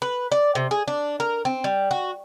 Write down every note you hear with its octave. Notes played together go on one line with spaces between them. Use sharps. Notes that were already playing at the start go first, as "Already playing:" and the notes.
B4
D5
C3
G#4
D4
A#4
C4
G3
F#4